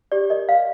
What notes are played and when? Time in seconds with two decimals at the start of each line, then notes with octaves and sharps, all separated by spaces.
0.12 G4 D5
0.30 A#4 D#5
0.49 D5 F5